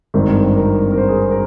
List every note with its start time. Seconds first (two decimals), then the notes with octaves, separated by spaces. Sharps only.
0.14 G#1 G2 D#3 C4
0.56 A#4
0.92 A#4
0.98 C5
1.08 G#4
1.19 A#4
1.31 A#4